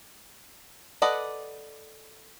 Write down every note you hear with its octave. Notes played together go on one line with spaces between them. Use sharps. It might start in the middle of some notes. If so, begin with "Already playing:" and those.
A4 B4 D5 D#5 F#5